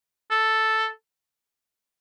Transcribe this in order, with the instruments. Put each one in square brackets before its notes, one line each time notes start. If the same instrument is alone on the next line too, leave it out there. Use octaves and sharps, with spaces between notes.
[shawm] A4